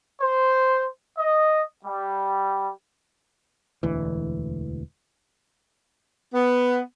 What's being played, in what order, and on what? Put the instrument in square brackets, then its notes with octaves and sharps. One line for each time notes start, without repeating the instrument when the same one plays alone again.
[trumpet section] C5
D#5
G3
[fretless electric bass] E1 D2 E3
[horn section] B3